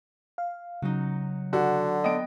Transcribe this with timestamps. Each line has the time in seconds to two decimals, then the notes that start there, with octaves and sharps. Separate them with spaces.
0.38 F5
0.82 C#3 F#3 D#4
1.53 D3 F#4
2.04 B3 D#5 G5 D7